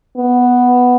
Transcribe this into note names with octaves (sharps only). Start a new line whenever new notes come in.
B3